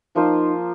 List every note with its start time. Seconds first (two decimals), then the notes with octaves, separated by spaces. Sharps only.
0.15 F3 A#3 D#4 F4 C5